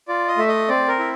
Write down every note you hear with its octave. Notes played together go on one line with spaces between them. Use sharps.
F4 D5
D#5
A3 E5
D#5
C4 D5
A#4
E4